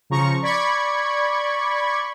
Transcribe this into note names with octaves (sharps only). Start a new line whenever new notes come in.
C#3 F3 A#5 C#6
D5 B5 C#6 G#6